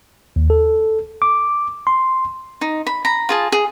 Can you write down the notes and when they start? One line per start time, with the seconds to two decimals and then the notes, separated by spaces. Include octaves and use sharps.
0.36 D#2
0.50 A4
1.22 D6
1.87 C6
2.61 D#4
2.87 B5
3.05 A#5 B5
3.29 F4 G#4 A5
3.52 G#4